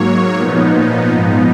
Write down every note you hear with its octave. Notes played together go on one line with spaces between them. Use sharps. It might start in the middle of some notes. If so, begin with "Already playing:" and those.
Already playing: G#2 F#3 A#3 C#5
A#2 F3 B3 D#4
G#2 F3 B3 D#4